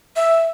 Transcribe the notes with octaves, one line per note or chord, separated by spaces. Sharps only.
E5